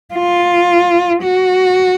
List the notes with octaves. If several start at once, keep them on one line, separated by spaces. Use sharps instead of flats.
F4
F#4